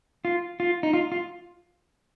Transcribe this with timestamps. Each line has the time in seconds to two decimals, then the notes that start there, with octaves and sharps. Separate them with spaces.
0.25 F4
0.60 F4
0.83 D#4
0.93 F4
1.12 F4